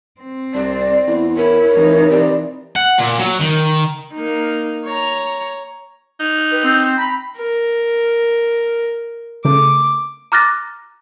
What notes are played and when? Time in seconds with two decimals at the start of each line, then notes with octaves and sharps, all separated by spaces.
0.21 C4
0.54 C2 D5
1.07 E2 E4
1.37 E4 A#4 C#5
1.75 F1 E3 D#4
2.11 C3 D5
2.76 F#5
2.99 A#2
3.19 F#3
3.40 D#3
4.14 A#3 D#4
4.85 C#5 A#5
6.20 D#4
6.52 B4 G5
6.64 C4
6.98 G5 A#5 B5
7.37 A#4
9.45 C#3 A3 D6
10.32 A#5 D6 F6 F#6 A6 A#6